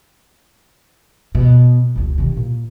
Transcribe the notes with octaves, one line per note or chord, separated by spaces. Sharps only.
B2
F1 C#2
C3 D#3
A#2